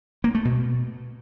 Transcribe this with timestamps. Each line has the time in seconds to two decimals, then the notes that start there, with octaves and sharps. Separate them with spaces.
0.24 A#3
0.35 A3
0.45 B2